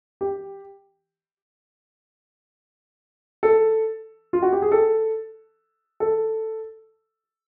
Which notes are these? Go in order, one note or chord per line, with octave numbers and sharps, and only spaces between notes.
G4
A4
F4
F#4
G4
G#4
A4
A4